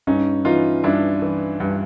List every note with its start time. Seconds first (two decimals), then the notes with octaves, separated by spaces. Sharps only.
0.07 G2 C#4 D#4
0.45 E3 D#4 F4
0.84 G2 D4 E4
1.22 E3
1.60 G2